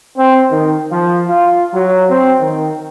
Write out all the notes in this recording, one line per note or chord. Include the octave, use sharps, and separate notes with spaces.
C4
D#3
F3
F4
F#3
C4
D#3